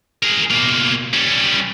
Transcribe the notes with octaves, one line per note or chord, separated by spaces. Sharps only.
G#4 A#4
B2 A#3
G3 C#4